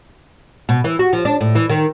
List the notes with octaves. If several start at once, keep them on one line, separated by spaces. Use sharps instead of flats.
B2
E3
F#4
F3
D4
A2
E3
D#3